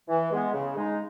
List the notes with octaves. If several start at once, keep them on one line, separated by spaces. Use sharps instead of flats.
E3
G#3 B3
C#3
G#3 D#4